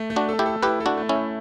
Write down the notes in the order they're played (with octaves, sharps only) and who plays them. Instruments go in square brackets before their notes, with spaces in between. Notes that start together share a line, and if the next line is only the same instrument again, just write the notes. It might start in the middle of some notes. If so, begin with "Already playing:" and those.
Already playing: [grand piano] A3
A3
[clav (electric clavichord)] D4 F#4
[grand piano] A4
[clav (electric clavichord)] E4 G4
[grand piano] A4
[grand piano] E4 [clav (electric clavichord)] G4 B4
[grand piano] A4
[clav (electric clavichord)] D4 F#4
[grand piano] A3
[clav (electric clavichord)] C#4 E4
[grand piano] A3